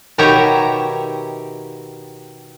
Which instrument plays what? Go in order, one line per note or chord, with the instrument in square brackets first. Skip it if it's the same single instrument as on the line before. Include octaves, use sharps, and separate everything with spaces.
[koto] B2 D#3 G4 C#5 E5 A#5